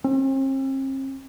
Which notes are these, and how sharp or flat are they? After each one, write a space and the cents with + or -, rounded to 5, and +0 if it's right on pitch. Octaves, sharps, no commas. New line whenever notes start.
C4 +45